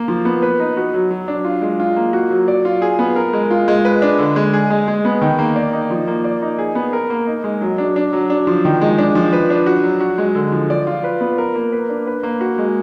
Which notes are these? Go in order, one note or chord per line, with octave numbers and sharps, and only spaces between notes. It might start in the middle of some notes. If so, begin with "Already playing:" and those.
Already playing: A#3
F3
B3
B4
D#4
F#4
F#3
F#3
D4
F4
G#3
F4
A#3
F#4
F#3
D5
F4
G#4
B3
A#4
G#3
F4
G#3
B4
D4
D3
G#3
G#4
G#3
G#3
B3
D#3
A#3
D5
D#4
F3
A#3
D5
D#4
G#4
B3
A#4
A#3
D#4
G#3
F#3
D4
D4
F#3
D4
F3
D#3
G#3
D4
F3
B4
D4
F#4
F#3
F#4
G#3
D3
F3
D5
F4
B4
B3
A#4
A#3
B4
D4
B4
A#3
F#4
G#3